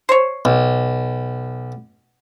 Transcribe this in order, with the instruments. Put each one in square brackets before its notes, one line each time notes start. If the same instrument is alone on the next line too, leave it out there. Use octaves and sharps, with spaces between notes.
[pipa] C5 C#5
[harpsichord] B1